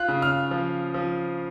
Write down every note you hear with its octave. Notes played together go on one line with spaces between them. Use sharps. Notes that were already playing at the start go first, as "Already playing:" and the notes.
Already playing: F4 F#6
C#3
F6
F3
F3